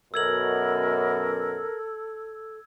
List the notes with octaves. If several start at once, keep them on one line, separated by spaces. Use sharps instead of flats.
F#2 B2 A4 A#4 E6 G#6 F#7